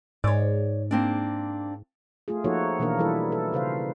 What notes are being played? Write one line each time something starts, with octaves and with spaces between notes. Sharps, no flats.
G#2 C#5 D5
A#3 C4 D4
A3 F4 G#4
F3 A#3 D#4 F#4 A4 C#5
B2 E3 A#3 D4 A#4
E3 G3 E4 A4 B4
A4
C#3 B4 C5 F5